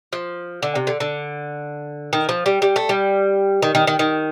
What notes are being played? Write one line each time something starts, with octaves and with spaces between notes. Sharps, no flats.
F3
D3
C3
D3
D3
D#3
F3
G3
G3
A3
G3
D#3
D#3
D#3
D#3